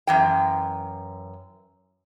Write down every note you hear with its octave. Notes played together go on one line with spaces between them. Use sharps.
F#2 E3 G5